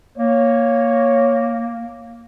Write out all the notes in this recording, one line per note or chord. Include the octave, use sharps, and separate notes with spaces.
A#3 C#5